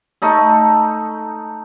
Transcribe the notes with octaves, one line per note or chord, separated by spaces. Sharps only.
A3 D#4 A4